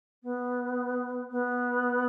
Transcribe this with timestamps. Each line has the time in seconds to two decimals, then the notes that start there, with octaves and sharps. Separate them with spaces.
0.23 B3
1.30 B3